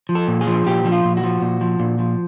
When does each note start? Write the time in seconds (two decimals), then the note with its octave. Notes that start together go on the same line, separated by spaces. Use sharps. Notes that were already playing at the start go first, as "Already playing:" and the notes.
0.09 F3
0.15 A4
0.28 A#2
0.41 G#4
0.47 F3
0.66 A#2 G4
0.85 F3
0.92 F4
1.05 A#2
1.17 F#4
1.23 F3
1.42 A#2
1.61 F3
1.80 A#2
1.99 F3